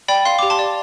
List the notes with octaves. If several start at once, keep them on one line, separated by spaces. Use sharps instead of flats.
D5 G5 B5
F5 C6
G4 D6
A5 C6
D5